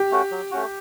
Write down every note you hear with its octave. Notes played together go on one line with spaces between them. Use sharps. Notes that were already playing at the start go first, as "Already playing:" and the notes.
Already playing: G4
A3 C#4 F#4
F#3
A3 C#4 F#4